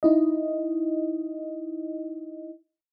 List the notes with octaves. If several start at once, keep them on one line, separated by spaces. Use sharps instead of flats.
D#4 E4 D#5